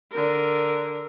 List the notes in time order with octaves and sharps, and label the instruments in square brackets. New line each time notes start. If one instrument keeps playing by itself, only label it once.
[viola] D3 A#4